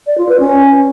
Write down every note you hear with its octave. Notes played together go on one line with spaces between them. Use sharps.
D5
F4
B4
C#4